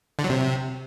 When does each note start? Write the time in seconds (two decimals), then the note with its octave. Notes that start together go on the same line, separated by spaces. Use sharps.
0.19 D3
0.24 F#3
0.30 C3